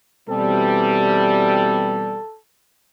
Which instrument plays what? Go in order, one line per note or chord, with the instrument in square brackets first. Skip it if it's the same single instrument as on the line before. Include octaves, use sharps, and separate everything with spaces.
[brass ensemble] B2 E3 C4 [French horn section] G3 [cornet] A4